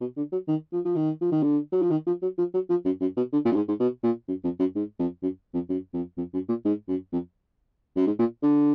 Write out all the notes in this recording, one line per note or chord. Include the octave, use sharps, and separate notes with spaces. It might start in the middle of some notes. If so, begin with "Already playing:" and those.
B2
D3
F#3
D#3
F3
F3
D#3
F3
D#3
D3
F#3
F3
D#3
F3
F#3
F3
F#3
F3
F#2
F#2
B2
D3
A#2
F#2
G#2
G#2
B2
A#2
F#2
F2
F#2
G#2
F2
F#2
F2
F#2
F2
F2
F#2
A#2
G#2
F#2
F2
F#2
G#2
A#2
D3